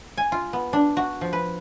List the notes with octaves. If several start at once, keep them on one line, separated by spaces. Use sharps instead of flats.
G#5
F4
B3
D4
F#4
F3
B4